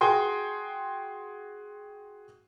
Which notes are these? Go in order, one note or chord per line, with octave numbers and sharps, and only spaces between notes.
F#4 G#4 G5 C6